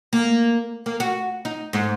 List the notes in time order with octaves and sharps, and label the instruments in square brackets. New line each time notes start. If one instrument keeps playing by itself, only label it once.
[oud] A#3
A#3
F#4
D#4
G#2